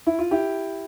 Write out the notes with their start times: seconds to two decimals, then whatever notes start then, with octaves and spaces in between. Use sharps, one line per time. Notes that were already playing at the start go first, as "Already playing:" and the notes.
0.07 E4
0.19 F4
0.31 E4 G4